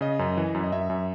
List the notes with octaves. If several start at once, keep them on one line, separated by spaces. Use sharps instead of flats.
C#3 D#5
F#2
E3
F#2
D#5
F#2 E5
F#2